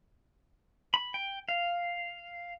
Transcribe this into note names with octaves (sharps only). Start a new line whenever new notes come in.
B5
G5
F5